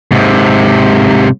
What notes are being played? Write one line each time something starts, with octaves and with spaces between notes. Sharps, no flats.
G#2 C3